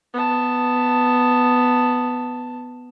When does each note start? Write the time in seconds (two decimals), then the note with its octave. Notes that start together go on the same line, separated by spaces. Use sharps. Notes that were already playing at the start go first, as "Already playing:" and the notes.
0.13 B3 A5